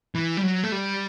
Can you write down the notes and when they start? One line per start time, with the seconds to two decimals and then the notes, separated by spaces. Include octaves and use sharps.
0.15 E3
0.37 G3
0.43 F#3
0.63 A3
0.72 G3